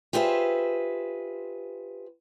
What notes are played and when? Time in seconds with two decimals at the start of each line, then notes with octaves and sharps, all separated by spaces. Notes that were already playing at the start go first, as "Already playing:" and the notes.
0.13 F4 G4 G#4 B4 C5 E5